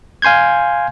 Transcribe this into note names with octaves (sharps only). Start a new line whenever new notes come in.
F5 G#5 C6 G6 G#6